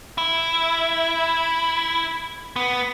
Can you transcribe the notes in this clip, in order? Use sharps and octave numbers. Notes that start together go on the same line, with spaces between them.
E4
B3